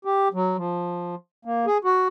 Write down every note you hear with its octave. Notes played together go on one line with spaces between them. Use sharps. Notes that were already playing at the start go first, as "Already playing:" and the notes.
G4
F#3
F3
A#3
G#4
F#4